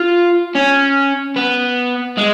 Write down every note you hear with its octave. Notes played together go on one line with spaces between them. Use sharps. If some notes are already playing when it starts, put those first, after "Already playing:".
Already playing: F4
C#4
B3
G#3